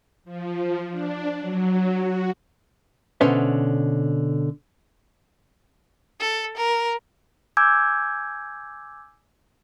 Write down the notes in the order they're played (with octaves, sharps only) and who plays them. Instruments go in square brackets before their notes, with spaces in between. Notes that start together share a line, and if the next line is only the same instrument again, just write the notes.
[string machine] F3
D4
F#3
F#4
[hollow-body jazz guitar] B2 D3 C#4 B4 C5 E5
[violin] A4
A#4
[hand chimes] G#5 D6 E6 G6 G#6